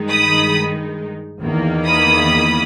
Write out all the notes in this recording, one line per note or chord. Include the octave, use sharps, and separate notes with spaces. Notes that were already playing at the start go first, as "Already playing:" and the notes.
Already playing: G2 D#3 G#3 D#4
B5 D#6
E2 D#3 A#3
B5 D#6